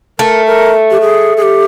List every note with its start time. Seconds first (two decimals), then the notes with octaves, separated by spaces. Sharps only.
0.19 A3 A#4
0.46 A#4
0.91 G4
1.01 G#4
1.37 G#4
1.42 G4